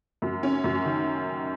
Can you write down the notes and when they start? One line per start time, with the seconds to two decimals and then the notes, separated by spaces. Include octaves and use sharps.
0.22 F#2
0.43 C#4
0.64 F#2
0.85 D#3